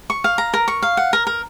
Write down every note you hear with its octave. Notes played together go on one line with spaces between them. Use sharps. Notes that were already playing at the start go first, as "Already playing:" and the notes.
C#6
F5
A#5
A#4
C#6
F5
F#5
A#4
A#4